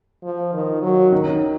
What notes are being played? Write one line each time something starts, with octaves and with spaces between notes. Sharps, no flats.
F3
D#3
F#3
D#3